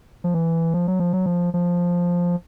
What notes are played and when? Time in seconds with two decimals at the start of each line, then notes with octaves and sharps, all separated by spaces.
0.24 F3
0.34 E3
0.74 F3
0.88 F#3
1.00 F3
1.13 F#3
1.26 F3
1.54 F3